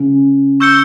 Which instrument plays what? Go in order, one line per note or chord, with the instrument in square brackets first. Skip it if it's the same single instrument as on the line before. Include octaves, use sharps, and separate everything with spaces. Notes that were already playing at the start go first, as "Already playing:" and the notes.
Already playing: [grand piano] C#3
[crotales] C#6 E6 G6 C#7 G7